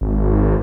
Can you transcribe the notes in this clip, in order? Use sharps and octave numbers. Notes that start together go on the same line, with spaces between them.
G#1